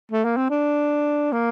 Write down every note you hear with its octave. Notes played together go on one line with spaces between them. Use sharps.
A3
A#3
C4
D4
A#3